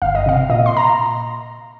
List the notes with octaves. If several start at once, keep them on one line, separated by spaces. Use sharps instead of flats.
G1 F5
D#5
C3 F5
A#2 D#5
C6
A#5